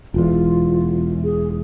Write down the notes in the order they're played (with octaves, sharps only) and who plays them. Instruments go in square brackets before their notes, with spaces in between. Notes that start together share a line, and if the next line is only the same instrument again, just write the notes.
[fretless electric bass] E1 E2 [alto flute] F4
[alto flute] G#4